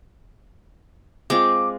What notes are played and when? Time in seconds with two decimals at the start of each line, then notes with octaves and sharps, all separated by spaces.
1.30 G#3 C4 F4 D6